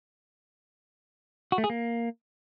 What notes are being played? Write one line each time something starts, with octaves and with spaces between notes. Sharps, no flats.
F#4
A3
G#4
A#3